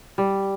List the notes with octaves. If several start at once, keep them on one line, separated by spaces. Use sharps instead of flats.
G3